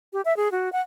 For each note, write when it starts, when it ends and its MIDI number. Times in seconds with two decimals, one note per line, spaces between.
0.13 0.21 67
0.25 0.36 76
0.37 0.51 68
0.52 0.72 66
0.73 0.81 78